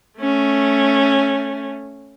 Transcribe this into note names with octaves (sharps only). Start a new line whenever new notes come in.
A3 C#4